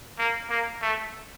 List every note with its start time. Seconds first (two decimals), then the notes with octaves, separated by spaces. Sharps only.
0.19 A#3
0.50 A#3
0.82 A3